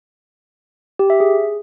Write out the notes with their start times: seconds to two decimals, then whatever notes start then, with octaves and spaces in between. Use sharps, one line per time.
0.99 G4
1.10 E5
1.20 G#4